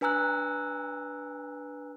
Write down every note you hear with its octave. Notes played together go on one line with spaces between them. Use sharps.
D4 B4 G#5 A#5 E6 F#6